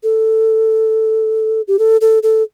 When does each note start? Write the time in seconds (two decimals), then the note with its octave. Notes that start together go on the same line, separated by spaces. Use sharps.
0.03 A4
1.68 G4
1.79 A4
2.01 A4
2.23 A4